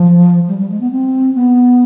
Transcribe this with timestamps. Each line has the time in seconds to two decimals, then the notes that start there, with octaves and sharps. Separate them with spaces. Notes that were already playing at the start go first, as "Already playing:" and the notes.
Already playing: F3
0.48 G3
0.58 G3
0.69 G#3
0.80 B3
0.91 C4
1.35 B3